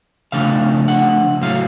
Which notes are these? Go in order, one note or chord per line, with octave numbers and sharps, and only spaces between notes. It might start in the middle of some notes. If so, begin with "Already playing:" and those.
C#3 F3 A3 D4 F5
F#5
A2 F#3 A3 F5